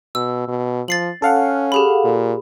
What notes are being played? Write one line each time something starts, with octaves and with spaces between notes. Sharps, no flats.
B2 E6
B2
F3 A6 C7 F#7
C#4 A4 F5 F#5
G4 G#4 B5
A#2